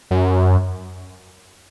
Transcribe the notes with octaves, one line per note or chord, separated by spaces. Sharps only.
F#2